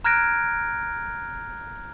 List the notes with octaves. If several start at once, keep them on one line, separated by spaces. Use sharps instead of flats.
A#5 F6 F#6 G#6 A#6 D7